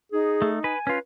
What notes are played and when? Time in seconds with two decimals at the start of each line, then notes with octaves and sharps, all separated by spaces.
0.12 D#4 G#4
0.42 A3
0.64 B4 G#5
0.87 C#4 F4 B4